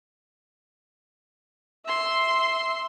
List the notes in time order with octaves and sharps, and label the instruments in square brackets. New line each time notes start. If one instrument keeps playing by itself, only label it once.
[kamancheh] E5 C6